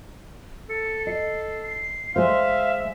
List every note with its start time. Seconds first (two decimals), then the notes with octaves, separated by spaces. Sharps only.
0.70 A4 C#7
1.07 D#5 C7
1.62 C7
2.16 G#3 C5 E5 F5